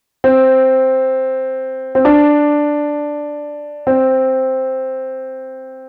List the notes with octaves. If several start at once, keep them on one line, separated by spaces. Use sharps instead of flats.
C4
C4
D4
C4